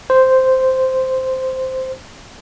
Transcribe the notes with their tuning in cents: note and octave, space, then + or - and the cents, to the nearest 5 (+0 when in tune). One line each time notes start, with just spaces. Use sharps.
C5 -5